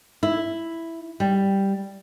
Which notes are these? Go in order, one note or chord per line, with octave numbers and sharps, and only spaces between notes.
E4
G3